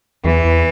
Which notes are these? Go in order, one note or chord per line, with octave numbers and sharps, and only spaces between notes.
E2 E3
E2